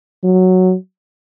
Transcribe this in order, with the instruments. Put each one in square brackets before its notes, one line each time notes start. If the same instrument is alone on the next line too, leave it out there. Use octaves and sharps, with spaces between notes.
[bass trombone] F#3